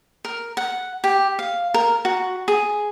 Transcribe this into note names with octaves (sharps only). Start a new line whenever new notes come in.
A#4
F#5
G4
F5
A#4
F#4
G#4